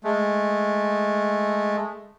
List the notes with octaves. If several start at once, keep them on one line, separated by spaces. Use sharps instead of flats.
G#3 A3